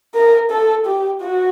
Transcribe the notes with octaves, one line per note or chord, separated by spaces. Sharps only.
A#4
A4
G4
F#4